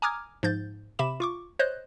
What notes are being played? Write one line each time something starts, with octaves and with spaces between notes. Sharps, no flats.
G#5 A#5 D6 D#6 F6 G#6
G#2 F3 G6 A6
C3 E5 B5 D6 E7
F4 C#6 D6
C5 C#5 D#5 F#6 G6